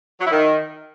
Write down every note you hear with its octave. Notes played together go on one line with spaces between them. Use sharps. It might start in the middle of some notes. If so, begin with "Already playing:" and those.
F#3
E4
D#3